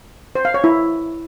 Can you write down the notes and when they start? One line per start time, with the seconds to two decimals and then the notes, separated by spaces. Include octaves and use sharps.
0.35 C5
0.45 F5
0.54 C#5
0.64 E4